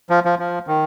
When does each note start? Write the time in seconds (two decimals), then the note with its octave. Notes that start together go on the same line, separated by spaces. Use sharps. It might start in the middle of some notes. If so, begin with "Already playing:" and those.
0.10 F3
0.25 F3
0.39 F3
0.67 D#3